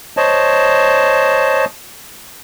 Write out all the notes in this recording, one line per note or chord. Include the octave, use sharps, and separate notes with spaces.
C5 C#5 D#5 A5